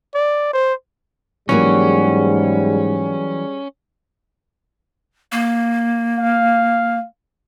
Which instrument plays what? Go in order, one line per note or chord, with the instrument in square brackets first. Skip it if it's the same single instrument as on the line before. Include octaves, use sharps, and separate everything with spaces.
[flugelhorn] D5
C5
[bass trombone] G#2 [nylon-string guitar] E3 F#3 A#3 [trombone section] G3 G#4 [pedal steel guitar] C#4
[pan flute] A#3
[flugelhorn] F5